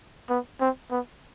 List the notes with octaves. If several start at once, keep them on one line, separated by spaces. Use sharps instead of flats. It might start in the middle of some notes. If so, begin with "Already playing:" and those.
B3
C4
B3